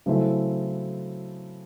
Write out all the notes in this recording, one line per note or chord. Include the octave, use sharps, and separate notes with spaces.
C#3 F#3 A3 C4 E4